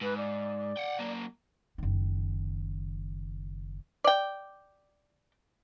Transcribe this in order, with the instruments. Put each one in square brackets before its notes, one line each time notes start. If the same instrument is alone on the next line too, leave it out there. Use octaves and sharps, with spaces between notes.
[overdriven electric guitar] G#2 [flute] B4
[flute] D5
[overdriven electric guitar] F#5 G5
F#3 A#3
[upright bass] F#1 D#3
[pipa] D5 G5